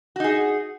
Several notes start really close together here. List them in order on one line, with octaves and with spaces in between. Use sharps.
F#4 D#4 G#4